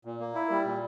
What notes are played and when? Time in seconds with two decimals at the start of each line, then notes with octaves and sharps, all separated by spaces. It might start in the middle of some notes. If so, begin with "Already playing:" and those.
0.05 A#2
0.20 A#3
0.35 E4
0.50 G3
0.66 A#2